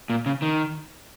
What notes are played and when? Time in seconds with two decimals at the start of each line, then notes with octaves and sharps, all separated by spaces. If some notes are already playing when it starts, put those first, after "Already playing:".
0.10 A#2
0.26 C#3
0.42 D#3